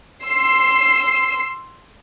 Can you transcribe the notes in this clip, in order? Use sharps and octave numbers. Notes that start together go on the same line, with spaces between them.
C6 E6 C7